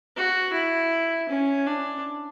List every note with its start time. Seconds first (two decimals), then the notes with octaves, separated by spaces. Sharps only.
0.16 F#4
0.54 E4
1.29 C#4
1.66 D4